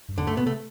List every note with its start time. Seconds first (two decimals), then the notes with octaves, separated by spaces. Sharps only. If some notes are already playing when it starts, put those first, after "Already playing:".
0.09 G2
0.18 F2 D3
0.27 G2 A3
0.37 B2 B3
0.46 C3 A3